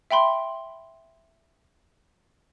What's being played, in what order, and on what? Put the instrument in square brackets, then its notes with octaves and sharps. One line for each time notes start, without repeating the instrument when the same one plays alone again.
[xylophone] E5 G5 B5 C6